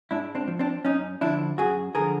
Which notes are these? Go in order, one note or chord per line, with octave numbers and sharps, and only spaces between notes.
G#2 D4 E4
C4 D4
F3
C4 D4
F#2 C#4 D#4
D3 F3 D4 E4
F#2 F#4 G#4
D3 F3 G#4 A#4